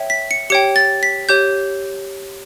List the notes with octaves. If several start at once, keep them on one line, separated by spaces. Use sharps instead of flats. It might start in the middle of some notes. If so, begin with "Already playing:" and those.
Already playing: C#5 E5 G5
B6
C#7
G4 C#5 G5 C#7
A6
B6
G4 C#5 G6